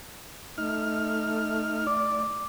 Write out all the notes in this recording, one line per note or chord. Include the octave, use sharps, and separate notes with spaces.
A3 D#4 F6
D5 D6